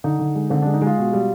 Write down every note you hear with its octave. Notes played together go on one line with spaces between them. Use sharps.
D3 D#4
D3
G#3
D3 C4
G#3 D4
D#4
G#3 F4
B2
G3